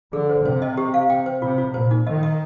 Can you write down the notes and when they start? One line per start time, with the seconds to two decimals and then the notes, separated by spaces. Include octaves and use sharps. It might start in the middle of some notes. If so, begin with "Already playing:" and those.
0.13 D3 G#4
0.29 C5
0.45 C3 C5
0.62 D#5
0.77 G4
0.94 F5
1.10 G5
1.26 C5
1.42 C3 F4
1.58 F4
1.74 A#2 C5
1.91 D#4
2.06 D#3 D#5
2.23 D#5